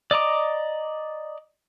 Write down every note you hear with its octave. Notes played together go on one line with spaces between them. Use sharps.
D5 D#5 A#5 D6